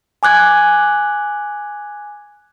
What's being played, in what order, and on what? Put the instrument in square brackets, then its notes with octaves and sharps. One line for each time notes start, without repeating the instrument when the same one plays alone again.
[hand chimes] G#5 D6 F#6 G#6